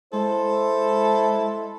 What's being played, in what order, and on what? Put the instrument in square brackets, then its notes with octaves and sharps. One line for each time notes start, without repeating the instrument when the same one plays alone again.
[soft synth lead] G#3 [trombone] E4 [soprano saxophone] A4 [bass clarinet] C5